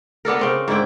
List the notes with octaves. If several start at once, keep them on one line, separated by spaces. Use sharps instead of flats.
B3 D4 A4 A#4
C#3 C4 A#4
G#2 D3 E4 G5